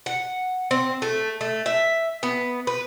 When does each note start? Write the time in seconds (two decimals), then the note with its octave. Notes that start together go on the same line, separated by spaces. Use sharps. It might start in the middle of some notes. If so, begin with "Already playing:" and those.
0.06 F#5
0.71 C4
1.02 A3
1.41 A3
1.66 E5
2.23 B3
2.67 B4